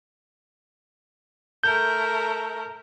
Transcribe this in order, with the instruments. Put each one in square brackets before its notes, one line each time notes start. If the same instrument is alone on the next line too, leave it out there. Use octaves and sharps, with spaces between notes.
[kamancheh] A3 A#4 [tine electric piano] G6